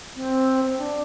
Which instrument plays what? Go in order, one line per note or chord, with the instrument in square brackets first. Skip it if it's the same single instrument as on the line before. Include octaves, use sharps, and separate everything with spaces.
[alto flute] C4
C4
D4